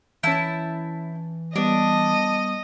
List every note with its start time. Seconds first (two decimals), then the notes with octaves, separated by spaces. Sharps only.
0.23 E3 C#4 E4 A5 G6
1.56 G3 B3 D4 D#5